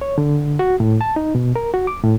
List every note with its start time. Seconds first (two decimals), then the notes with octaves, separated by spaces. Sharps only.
0.01 C#5
0.18 D3
0.59 F#4
0.80 A2
1.01 A5
1.16 D#4
1.35 B2
1.56 A#4
1.74 F#4
1.87 D6
2.03 A2